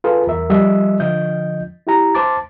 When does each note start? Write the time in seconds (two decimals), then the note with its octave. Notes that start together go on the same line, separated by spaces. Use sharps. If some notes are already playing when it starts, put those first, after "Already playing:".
0.04 F4 G#4 A4 B4
0.27 E2 A#4 E5
0.50 F3 G3 D#5 E5
1.00 D3 F3 D#5 G6
1.87 E4 G4 A#5
2.15 C5 A5 D6 A6